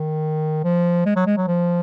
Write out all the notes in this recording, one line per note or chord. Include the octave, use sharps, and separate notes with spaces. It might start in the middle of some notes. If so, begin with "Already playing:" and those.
Already playing: D#3
F3
G#3
F#3
G#3
F#3
F3